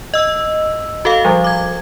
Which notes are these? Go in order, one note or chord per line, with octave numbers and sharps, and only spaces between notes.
D#5 E6
F#4 A4 F5
F3 G3
D6 G#6